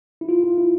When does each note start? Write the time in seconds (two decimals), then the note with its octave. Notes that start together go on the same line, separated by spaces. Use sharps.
0.21 E4
0.29 F4
0.44 F4
0.58 E4